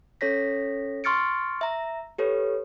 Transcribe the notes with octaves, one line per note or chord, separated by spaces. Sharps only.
C#4 A4 C#5 A#6 B6
C6 C#6 F6 A6 C#7 D7
E5 A#5
G4 A4 B4 C#5